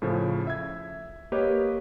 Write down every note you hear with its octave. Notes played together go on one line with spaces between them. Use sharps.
A2 C#3 F3
E5 G#6
A#3 G4 B4 C#5 D#5